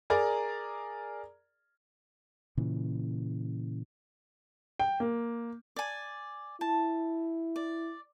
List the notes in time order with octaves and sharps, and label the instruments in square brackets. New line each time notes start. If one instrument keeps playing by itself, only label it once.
[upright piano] G#4 A#4 D5 A#5
[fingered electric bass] A#2 C#3 E3
[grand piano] G5
A#3
[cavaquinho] D5 G#5
[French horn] E4 [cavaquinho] A5
[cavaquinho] D5